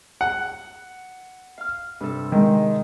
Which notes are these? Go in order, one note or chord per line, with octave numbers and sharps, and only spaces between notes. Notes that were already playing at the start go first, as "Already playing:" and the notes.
F#5
F5 F6
G2 C3 A4
D#3 G#3